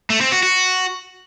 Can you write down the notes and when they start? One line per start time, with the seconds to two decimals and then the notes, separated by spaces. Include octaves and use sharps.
0.10 A3
0.21 C4
0.32 F#4
0.43 F#4